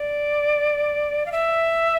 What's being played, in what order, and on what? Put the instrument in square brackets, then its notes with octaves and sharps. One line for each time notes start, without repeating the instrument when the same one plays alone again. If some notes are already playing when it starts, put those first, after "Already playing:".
Already playing: [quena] D5
F5
E5